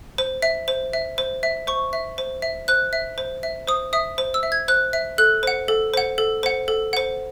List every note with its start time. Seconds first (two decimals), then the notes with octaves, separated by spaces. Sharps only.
0.18 C5
0.42 E5
0.68 C5
0.93 E5
1.18 C5
1.43 E5
1.67 C5 C#6
1.93 E5
2.18 C5
2.42 E5
2.68 C5 F#6
2.93 E5
3.18 C5
3.43 E5
3.68 C5 D#6
3.93 E5 D#6
4.18 C5
4.34 E6
4.43 E5
4.52 G#6
4.68 C5 F#6
4.93 E5
5.18 A4 F#6
5.43 C5 F#5
5.68 A4
5.94 C5 F#5
6.18 A4
6.43 C5 F#5
6.68 A4
6.93 C5 F#5